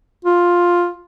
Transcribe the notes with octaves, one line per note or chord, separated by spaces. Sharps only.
F4